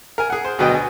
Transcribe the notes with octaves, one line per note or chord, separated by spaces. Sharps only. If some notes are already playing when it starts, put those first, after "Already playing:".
A#4 G#5
G#4 F#5
C5
D2 B2 F#3 B4 D#5 G5
G#5